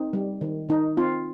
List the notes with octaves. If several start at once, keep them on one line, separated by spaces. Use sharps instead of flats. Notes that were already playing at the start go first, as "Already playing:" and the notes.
Already playing: C4 D#4
G3
D#3
D#3 D#4
C4 F4